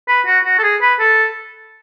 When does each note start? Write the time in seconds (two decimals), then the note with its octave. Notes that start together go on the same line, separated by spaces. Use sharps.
0.08 B4
0.26 F#4
0.45 F#4
0.59 A4
0.63 G#4
0.82 B4
1.00 A4